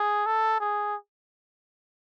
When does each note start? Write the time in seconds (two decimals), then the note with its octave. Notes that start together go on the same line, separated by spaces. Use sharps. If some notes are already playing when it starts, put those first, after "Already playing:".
Already playing: G#4
0.26 A4
0.60 G#4